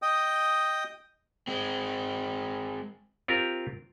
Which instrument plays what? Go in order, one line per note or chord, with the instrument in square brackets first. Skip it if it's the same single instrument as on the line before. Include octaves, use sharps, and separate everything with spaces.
[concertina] D#5 G5 D#6
[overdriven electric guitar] G#3 C4
[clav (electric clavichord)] C4 F4 G4 A#4